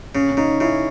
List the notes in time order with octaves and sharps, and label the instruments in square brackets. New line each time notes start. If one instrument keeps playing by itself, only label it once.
[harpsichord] C#3 [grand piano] C#4
[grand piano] C#4
[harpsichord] C#3 [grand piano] D#4
[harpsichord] C#3 [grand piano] E4